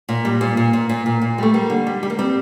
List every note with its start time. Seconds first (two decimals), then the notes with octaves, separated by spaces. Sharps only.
0.09 A#2
0.25 G3
0.41 A#2
0.57 A#2
0.73 A#2
0.89 A#2
1.06 A#2
1.22 A#2
1.38 G3 A3
1.54 G3 A#3
1.70 D3
1.87 G3
2.03 G3
2.10 A#3
2.19 G3 C4